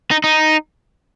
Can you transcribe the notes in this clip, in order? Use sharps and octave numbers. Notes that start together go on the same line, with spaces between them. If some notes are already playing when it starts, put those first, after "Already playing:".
D#4
D#4